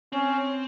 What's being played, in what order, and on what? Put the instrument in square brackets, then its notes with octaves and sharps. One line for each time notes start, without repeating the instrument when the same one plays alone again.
[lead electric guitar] C4 [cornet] C#4